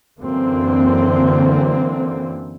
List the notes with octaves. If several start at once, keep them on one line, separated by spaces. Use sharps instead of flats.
F#2 D3 E3 A#3 C4